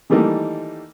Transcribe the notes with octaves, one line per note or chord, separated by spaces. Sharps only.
D#3 E3 G3 A3 A#3 D#4